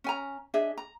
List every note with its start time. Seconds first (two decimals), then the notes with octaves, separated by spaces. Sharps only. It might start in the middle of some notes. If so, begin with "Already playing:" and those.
0.04 C#4 G#5 A#5
0.54 D4 G#4 D#5 E5
0.78 A#5